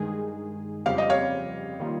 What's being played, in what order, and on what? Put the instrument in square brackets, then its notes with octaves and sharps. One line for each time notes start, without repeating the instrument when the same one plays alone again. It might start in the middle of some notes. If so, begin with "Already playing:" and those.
Already playing: [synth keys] G2 D#3 G#3 D#4 G#4
[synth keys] F2 C#3 G3 C4 G4 [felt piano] F5
[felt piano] D#5
C#5 F5
[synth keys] D#3 G3 A#3 F4